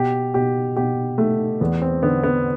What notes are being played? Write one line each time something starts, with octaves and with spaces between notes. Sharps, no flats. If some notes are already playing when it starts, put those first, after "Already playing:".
Already playing: B2 G4
B2 G4
B2 G4
A3
E2 B3
C4
D3 B3
B3